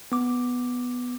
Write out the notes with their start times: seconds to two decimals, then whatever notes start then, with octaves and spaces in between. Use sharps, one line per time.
0.12 B3 D6